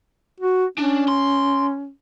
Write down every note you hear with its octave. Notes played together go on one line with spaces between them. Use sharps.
F#4
C#4 D4
C6